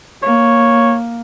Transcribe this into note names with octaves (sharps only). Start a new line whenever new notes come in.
A#3 C#5